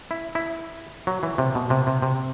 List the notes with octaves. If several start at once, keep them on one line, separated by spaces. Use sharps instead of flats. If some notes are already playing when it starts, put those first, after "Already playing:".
E4
E4
F#3
E3
C3
B2
C3
C3
C3